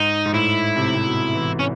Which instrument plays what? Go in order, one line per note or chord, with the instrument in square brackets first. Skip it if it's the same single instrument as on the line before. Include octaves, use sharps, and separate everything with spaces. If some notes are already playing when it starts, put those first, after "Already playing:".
Already playing: [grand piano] G#2 [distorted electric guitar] D#4
[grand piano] G#2
[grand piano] A2 [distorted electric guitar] E4
[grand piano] C3
C3
B2
E3
[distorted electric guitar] C#4